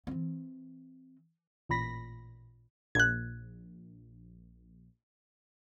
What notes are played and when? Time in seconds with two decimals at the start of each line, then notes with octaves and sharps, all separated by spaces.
0.07 E3 C4
1.69 A1 A#2 B5 A#6 B6
2.95 A#1 F#6 G#6